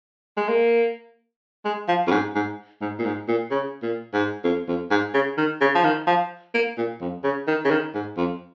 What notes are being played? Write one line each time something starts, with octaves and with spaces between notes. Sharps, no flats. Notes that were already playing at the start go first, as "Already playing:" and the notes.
G#3
A#3
G#3
F3
F2
G#2
G#2
G#2
A#2
G#2
A#2
C#3
A#2
G#2
F2
F2
G#2
C#3
D#3
C#3
F3
D#3
F3
A#3
A#2
F2
C#3
D#3
C#3
D#3
G#2
F2